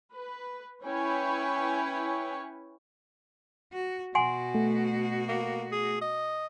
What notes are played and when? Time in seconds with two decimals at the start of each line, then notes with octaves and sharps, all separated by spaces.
0.13 B4
0.83 C#4 E4 B4 C#5 G5 G#5
3.73 F#4
4.15 B2 F#4 F#5 G#5 C6
4.55 A3
5.28 A#3
5.72 G#4
6.01 D#5